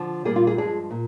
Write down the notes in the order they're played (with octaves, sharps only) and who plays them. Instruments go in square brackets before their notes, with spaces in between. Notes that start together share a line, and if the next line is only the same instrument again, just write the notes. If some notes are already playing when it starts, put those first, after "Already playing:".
Already playing: [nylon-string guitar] D3 F3
A#2 G3 A#3 G#4
F4
G#4
G2 F3 G#3 G#4
A#2